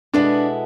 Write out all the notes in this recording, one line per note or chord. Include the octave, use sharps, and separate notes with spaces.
B2 G#3 B3 D4 E4 A4